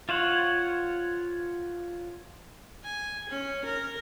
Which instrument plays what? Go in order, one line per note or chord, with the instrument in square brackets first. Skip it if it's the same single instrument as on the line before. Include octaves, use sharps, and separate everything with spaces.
[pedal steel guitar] F4 C5 C#5 F#5
[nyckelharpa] G#5
C#4
A#4